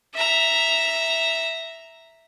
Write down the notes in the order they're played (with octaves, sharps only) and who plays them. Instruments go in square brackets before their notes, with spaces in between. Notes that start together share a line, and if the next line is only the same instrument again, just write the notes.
[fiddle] E5 A#5